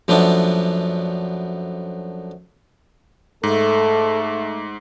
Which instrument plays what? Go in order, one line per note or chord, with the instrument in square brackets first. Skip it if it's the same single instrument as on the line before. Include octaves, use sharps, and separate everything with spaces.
[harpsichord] F#2 F3 A3 B3 D4
[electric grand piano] G#2 [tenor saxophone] A3 [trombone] A4